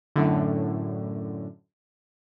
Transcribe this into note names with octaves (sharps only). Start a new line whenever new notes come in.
F#2 A2 D3